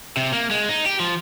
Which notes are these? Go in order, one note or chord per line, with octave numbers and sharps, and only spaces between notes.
C3
A#3
G#3
D#4
G4
F3